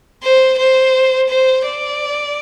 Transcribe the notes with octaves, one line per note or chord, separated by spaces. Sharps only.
C5
C5
C5
D5